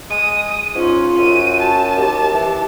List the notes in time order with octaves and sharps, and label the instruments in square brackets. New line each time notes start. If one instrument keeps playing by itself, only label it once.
[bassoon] G#3 [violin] D#6
[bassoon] G#2 [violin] C#4 [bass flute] F4
[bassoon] F#2 [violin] D#7
[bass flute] F#4 [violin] A5
[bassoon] D#2 [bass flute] G4
[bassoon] E3